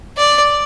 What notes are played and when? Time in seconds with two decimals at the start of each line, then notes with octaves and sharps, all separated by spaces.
0.18 D5